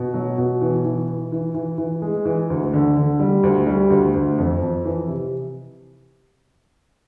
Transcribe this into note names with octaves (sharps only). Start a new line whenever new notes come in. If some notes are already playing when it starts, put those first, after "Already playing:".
Already playing: B2
F#3
B2
E3
E3
E3
E3
E3
E3
G#3
E3
D2
D3
D3
G3
D2
G3
D2
D2
F2
F2
E3
C3